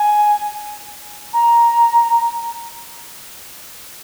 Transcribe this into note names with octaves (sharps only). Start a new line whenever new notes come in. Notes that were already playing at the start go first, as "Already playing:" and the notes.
Already playing: G#5
A#5